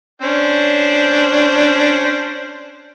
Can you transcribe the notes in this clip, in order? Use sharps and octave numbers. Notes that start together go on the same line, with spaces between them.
C#4 D4 C5